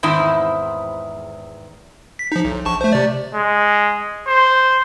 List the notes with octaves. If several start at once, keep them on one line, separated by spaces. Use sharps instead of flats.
E2 G#2 D#3 C4 E4
B6
F3 D#4
B1
A#1 A5 C#6
A3 C5
C3 D5
G#3
C5